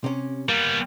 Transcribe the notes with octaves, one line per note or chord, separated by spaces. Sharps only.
C3 C#4
G3 A#3 B3